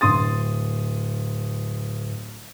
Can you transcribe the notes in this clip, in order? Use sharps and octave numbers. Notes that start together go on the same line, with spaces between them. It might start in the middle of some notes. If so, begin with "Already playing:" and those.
D1 C6 D#6 A6